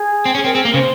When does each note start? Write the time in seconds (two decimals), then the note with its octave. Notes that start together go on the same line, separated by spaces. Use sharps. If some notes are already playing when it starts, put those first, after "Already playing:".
Already playing: G#4
0.25 C4
0.35 C#4
0.44 C4 A#4
0.54 C4 G#4
0.64 A#3 A#4
0.74 C#3 C5